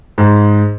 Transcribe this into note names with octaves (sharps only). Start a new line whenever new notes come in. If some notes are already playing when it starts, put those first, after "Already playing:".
G#2